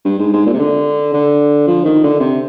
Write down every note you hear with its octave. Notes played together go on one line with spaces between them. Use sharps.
G2
G#2
G#2
A#2
C3
D3
D3
F3
D#3
D3
C3